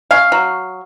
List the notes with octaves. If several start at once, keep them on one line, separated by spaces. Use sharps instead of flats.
C#4 F5
F#3